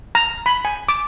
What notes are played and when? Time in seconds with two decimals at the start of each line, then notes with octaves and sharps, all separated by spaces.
0.15 A#5
0.46 B5
0.65 G#5
0.89 D6